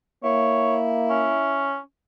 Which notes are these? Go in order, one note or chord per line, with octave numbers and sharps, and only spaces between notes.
A#3 E4 C#5
C#4